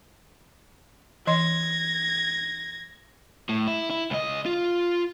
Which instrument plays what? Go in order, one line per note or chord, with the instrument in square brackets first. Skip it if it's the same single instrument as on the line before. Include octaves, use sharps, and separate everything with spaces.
[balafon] E3 D#5 C6 [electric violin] G#6 A#6
[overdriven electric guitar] A2
E4
E4
C#2 D#5
F4